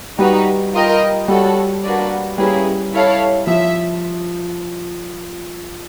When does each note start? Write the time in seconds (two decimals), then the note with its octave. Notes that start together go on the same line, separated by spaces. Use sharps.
0.18 G3 D#4 F#4 B4
0.73 F4 A#4 D#5 G5
1.28 G3 F#4 A4 C#5
1.83 A#3 D4 F#4 B4 D5
2.37 G3 A#3 C#4 E4 G#4 B4
2.93 E4 A4 C#5 F5
3.47 F3 E5